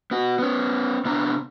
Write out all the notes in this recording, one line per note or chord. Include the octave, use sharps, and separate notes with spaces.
B3 F#4
B3 C#4
C3 B3 D4 A#5